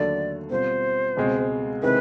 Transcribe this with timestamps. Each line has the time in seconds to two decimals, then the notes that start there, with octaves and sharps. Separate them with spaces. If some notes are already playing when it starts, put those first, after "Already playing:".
Already playing: D#2 D3 F#3 A3 D5
0.50 B2 G3 C4 F4 C5
1.16 C#2 B2 G#3 C4
1.82 C3 D#3 G#3 C4 E4 B4